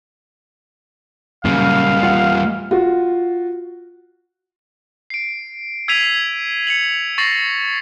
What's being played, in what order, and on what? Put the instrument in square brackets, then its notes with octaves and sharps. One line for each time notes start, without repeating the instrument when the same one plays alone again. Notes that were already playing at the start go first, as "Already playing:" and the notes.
[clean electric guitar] F#2 A#2 C#3 [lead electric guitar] G3 A#3 [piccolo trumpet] F5
[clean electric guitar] E2 F4 F#5
[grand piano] F4 F#4
[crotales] C7 D7
E6 G#6 B6 C7 D#7 F7
C#7 F7 F#7
C#6 A6 A#6 C7 F#7